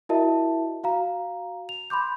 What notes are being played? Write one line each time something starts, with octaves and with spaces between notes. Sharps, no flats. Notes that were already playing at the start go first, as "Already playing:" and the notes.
E4 F#4 A#4 D#5 E5 A5
F#4 F5 A#5
F7
B5 C6 D6 G6